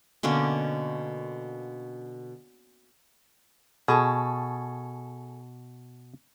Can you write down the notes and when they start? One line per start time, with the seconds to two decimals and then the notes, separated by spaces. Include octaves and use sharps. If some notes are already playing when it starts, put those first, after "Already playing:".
0.23 B2 D3 A#3 C#4
3.88 B2 G#4 A4 C#6